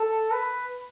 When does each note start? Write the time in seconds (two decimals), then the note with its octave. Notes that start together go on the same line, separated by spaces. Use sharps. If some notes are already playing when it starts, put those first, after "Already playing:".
Already playing: A4
0.31 B4